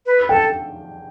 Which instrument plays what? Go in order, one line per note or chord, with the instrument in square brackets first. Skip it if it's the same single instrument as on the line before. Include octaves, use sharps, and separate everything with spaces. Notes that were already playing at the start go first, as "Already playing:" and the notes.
[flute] B4
[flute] A4 [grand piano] G5